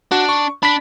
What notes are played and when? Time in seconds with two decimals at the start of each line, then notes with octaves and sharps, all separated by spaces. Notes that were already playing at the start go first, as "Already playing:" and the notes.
0.12 D4 F#4
0.29 C#6
0.63 D4 B5 B6